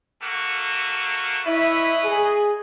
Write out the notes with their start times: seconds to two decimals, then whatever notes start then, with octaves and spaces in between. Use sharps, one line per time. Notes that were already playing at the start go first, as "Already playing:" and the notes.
0.22 A3 A#3 F#4
1.46 E4 B4 C#5 D#5 E5
2.05 G#4